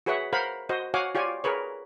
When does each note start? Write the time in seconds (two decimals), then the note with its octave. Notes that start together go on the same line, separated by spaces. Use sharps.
0.06 F#4 G#4 B4 C#5 E5 F#5
0.33 A#4 C5 F5 F#5 B5
0.69 F#4 C5 D#5
0.94 F#4 C#5 F5 F#5 G#5 D6
1.15 F4 G4 C#5 D5 G#5
1.44 G#4 A#4 B4 C#5